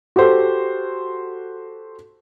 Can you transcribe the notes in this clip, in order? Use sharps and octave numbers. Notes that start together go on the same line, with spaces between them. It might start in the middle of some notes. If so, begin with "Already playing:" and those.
F#4 G4 A4 C5